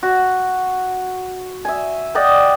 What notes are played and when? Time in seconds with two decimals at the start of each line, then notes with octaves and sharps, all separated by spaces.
0.03 F#4
1.65 E5 G#5
2.15 D5 D#5 F#5 G5